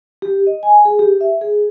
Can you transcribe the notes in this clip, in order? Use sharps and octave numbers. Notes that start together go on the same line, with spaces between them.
G4
D#5
G#5
G#4
G4
E5
G#4